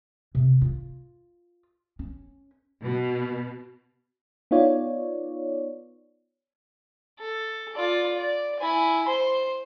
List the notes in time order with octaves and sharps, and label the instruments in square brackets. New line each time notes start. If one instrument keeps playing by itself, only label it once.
[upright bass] C3
F4
C#4
[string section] B2
[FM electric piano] B3 D#4 F4 C#5 D5
[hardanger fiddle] A4
F4 D5
D5
E4 G#5
C5 C6